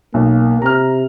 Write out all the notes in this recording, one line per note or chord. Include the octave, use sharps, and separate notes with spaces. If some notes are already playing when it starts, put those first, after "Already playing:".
B1 A#3
C3 A#5 F6